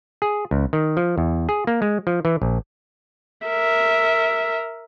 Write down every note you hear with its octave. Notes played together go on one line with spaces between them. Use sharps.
G#4
C#2
D#3
F3
E2
G#4
A#3
G#3
F3
E3
A#1
A#4 E5